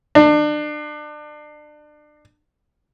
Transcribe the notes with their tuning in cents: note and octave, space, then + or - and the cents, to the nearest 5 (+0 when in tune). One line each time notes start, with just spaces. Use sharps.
D4 +30